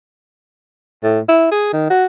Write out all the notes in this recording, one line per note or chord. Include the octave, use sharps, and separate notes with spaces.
A2
E4
G#4
D#3
F#4